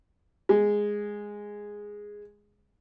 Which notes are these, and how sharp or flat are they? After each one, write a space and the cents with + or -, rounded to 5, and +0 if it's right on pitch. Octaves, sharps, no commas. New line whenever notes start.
G#3 -5